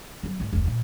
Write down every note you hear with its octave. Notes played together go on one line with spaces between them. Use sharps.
F#3 B3
G#1 A3
F1 D2
A#2